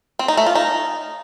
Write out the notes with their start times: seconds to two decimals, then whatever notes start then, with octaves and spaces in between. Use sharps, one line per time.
0.19 C4
0.28 D#4
0.37 A3
0.46 F4
0.55 D#4